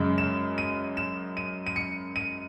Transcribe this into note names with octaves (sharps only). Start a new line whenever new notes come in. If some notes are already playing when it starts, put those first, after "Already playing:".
Already playing: F#2 C#3 G#3
E7
D#7
E7
D#7
D#7
C#7
D#7